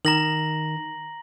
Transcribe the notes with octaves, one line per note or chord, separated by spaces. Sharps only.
D#3 A#5 A#6 F#7